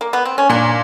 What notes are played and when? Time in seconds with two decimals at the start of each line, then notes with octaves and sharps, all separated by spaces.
0.01 A#3
0.13 B3
0.25 C4
0.38 C#4
0.49 A#2 D4